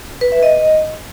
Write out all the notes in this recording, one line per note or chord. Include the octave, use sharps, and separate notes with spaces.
B4
E5
D#5